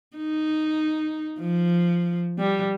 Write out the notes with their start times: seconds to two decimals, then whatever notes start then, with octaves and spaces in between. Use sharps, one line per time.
0.17 D#4
1.40 F3
2.39 G3